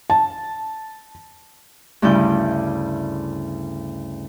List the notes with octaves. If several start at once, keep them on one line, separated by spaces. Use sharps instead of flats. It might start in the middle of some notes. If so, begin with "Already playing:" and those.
A5
D2 G2 C#3 D4 E4 G6